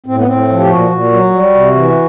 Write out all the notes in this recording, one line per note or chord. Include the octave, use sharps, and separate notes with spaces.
A2 C4
B3
A2 C4
F3
G4
A#2 F#4
A#2
F#3
G3
C3
E3